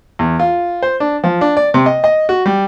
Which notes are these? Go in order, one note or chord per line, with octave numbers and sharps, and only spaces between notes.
E2
F4
C5
D4
F3
D4
D5
C3
D#5
D#5
F#4
G3